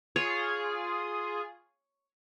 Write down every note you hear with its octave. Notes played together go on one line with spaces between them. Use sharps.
F4 G#4 C#5